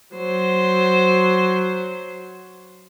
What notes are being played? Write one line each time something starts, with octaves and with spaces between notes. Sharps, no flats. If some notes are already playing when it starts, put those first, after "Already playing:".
F#3 C5